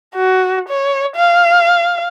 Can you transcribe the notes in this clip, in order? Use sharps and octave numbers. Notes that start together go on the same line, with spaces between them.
F#4
C#5
F5